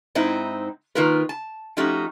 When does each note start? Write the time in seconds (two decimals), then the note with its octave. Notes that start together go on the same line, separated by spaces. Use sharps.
0.15 G#2 C4 D#4 E4
0.95 D#3 A#3 D#4 F4 A#4 B4
1.29 A5
1.77 F3 A3 C#4 D#4 F#4 G4